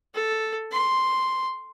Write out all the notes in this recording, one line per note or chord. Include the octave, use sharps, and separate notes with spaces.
A4
C6